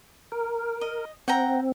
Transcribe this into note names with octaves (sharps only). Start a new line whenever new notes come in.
A#4
D#5
C4 F#5 G5 A#5